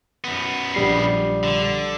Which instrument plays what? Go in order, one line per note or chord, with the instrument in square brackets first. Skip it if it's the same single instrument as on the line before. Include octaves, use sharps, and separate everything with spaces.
[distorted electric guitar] F#2 B3
[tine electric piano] A#1 G3 C7
[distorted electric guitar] D3